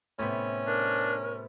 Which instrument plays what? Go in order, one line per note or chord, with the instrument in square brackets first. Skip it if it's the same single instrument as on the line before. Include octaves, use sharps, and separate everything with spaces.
[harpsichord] A2 C3 B3 [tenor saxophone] C#4
[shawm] D4 [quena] A#4